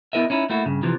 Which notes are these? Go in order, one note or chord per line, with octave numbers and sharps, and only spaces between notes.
B3 E4 A#4 D#5 E5
C#4 D#4 E4
A3 A#3 E4 F#4
G2 C#3
C3 E3 F3